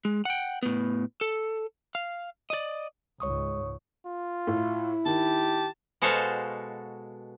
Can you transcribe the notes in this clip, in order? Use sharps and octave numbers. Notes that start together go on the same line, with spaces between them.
G#3
F#5 G5
A2 B3
A4
F5
D5 D#5
C#2 G#2 C#5 C#6 D#6
F4
A2 E4
D#3 G4 A5
B2 G#3 F#4 A4 C5 F5